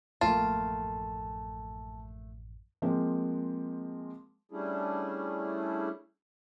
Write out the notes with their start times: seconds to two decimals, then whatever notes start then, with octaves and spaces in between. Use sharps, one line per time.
0.21 A1 F#2 F3 A3 A#3 F4 A5
2.82 F3 G#3 A#3 C4
4.52 G3 A3 C#4 D4 E4 G#4